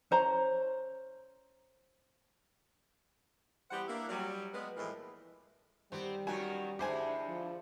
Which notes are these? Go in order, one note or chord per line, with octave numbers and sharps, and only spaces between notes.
C#4 C5 A#5
E3 G3 B3 G4 C5 F#5
A#3 D4 E4
F#3 G3
G#3 B3
A2 E3 F3 G3 G#3 A#3
D#3 G3 B3 C4 G4
D#3 F#3 B3 C#4 F#4 A#4 G#5
D3 G#3 D4 E4 G4 C5 G#5
F3